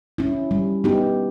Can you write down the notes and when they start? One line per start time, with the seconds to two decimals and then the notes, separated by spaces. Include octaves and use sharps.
0.18 C#4 E4
0.51 G3
0.84 B3 D#4 G4